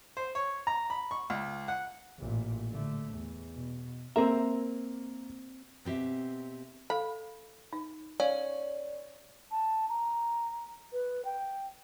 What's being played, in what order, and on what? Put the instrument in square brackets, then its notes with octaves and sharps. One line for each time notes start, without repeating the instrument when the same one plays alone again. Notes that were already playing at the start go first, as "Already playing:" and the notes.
[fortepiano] C5
C#5
A#5
B5
C#6
C#2
F#5
[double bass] A1 A#2
D3 A3
E2
B2
[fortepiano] A#3 A#5 [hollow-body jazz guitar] C4 E5
[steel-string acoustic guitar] B2 C4 G4 E5
[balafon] A4 F5 [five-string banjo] B5
[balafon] D#4
[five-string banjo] C#4 [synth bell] D5 [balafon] F5
[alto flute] A5
A#5
B4
G5